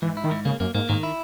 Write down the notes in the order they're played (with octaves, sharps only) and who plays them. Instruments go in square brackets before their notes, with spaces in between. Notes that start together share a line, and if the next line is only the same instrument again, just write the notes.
[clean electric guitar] G#2 [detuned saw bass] E3
[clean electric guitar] E4
[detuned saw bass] D#3
[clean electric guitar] G#2
[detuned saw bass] C#3 [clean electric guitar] A#3
[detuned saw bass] F#2 [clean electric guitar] A#3
[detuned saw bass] G#2 [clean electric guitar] A#3
[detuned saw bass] G#2 [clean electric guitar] D#3
[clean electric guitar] E4